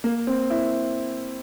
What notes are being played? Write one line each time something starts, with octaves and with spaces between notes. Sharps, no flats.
A#3
C4
E4